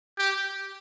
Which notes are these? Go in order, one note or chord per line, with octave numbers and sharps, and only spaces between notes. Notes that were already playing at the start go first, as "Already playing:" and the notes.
G4